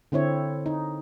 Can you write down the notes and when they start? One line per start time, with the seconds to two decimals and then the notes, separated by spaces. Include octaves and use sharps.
0.12 D3 C4 E4 C#5
0.66 D#4